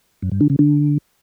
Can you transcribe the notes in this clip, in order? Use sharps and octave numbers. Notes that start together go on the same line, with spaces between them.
F#2
G2
D3
C#3
D3